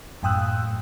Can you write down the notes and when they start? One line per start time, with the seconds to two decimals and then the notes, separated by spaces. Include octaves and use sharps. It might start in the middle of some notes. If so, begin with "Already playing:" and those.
0.23 F#2 A2 G5 D#6 E6 F#6